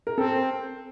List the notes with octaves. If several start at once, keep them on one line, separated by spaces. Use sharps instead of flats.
A#4
C4 A4